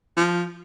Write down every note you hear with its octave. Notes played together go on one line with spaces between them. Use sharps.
F3